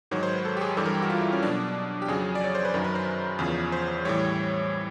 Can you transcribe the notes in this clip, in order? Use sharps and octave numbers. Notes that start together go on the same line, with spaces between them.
G#2 D#3 F#3 C#5
C5
B4
A4
G4
G#4
G2 E3 G3 A4
A#4
G4
F#4
F4
E4
C#4
B2 F#3 D4
G4
F2 C#3 F#3 G#4
D5
C#5
C5
B4
F#2 D#3 F#3 A#4
B4
C5
E2 C#3 F3
C5
A2 E3 G3 C#5